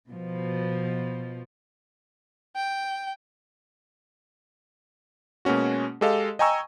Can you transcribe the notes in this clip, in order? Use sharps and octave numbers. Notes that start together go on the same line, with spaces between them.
B2 F3
G5
B2 G#3 A#3 C#4 F#4
G#3 G4 A4 D#5 F5
D#5 G5 G#5 A#5 C#6 E6